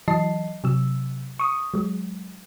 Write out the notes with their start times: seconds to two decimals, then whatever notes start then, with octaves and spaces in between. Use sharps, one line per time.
0.08 E3 F#3 D#5 A5 C7
0.64 C3 F#3 E6
1.40 C#6 D#6
1.74 F#3 G#3